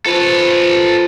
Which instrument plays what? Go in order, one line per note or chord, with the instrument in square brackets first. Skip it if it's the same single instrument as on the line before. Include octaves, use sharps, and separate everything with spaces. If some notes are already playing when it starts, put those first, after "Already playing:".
[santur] F3 A#5 B5 [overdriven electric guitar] A4 B4